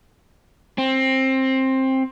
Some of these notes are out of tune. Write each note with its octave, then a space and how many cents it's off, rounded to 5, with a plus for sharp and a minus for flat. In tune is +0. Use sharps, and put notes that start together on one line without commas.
C4 +15